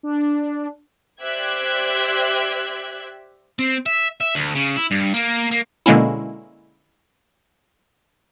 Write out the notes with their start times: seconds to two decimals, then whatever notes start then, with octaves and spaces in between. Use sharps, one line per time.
0.03 D4
1.22 G4 C5 D5 E5 F#6 G#6
3.59 C4
3.86 E5
4.21 E5
4.35 D2
4.55 C#3
4.76 E4
4.91 G2
5.14 A#3
5.51 A#3
5.86 B2 D3 G#3 A#3 C#4 E4